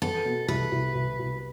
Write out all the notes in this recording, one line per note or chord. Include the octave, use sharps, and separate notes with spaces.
B3 A4
B2
C2 B4
C2
C2
C2